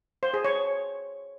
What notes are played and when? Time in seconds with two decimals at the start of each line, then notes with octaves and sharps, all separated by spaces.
0.23 C5
0.34 G#4
0.45 C#5